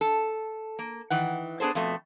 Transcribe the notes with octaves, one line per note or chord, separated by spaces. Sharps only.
A4
A#3
D#3 E3 F#5
B3 D4 G#4 A4 C5
F2 B2 A3